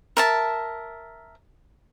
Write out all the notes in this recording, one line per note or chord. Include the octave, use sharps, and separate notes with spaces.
A#4 E5 A5